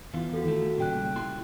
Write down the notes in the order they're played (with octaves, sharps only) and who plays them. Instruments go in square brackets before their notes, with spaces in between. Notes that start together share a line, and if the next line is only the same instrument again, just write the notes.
[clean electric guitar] E2 E3 F4
[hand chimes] F#4 A4
[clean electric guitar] D#3 A3
[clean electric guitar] A#2 C#3 G3 [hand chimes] G4 G5 F#6
[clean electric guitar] E4 F#4 C6